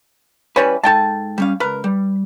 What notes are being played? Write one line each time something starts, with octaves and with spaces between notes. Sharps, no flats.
E3 G3 C#4 B4
G#2 A4 G5 A5
G3 C#4 F5
C#2 A#4 B4
G3